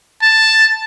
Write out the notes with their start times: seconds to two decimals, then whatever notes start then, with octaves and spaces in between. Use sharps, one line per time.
0.22 A5